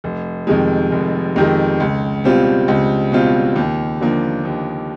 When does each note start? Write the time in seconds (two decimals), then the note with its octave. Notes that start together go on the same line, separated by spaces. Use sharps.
0.04 F1
0.47 F2 C3 D#3 G#3
0.92 F1
1.36 F2 C3 D#3 G#3
1.80 C#2
2.24 B2 G3 C4 F4
2.68 C#2
3.12 B2 G3 C4 F4
3.56 D#2
4.01 D3 F3 A#3
4.45 D#2